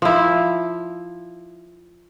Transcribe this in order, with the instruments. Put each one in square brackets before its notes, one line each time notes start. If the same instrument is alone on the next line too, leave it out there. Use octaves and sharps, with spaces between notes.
[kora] F3 E4